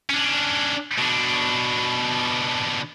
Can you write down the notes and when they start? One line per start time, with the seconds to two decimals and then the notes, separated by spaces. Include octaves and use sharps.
0.10 C#4 D4
0.98 B2 D4